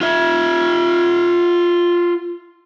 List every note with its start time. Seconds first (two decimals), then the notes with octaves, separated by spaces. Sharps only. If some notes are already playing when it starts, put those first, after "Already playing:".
0.01 F4 E5